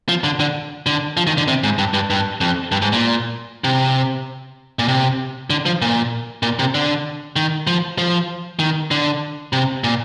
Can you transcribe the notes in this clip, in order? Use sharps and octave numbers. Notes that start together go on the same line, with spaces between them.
F3
D3
D3
D3
F3
D#3
D3
C3
G#2
G2
G2
G2
F2
G2
G#2
A#2
C3
A#2
C3
D3
F3
A#2
A#2
C3
D3
D#3
F3
F3
D#3
D3
C3
A#2